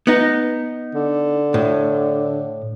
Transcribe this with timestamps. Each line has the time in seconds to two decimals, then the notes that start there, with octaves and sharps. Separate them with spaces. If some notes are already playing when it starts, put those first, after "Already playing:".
0.07 B3 D#4
0.94 D3
1.54 A2